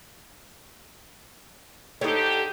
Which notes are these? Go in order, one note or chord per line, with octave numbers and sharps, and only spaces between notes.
D3 D#4 G4 A4 C#5